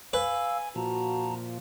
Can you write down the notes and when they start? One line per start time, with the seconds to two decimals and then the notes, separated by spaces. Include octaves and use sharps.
0.13 B4 F5 G#5 E6
0.76 A#2 F3 F#4 A5 A#5